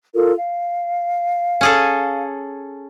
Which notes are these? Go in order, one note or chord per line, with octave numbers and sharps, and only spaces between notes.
F4 A4 A#4
F5
C#4 G#4 A4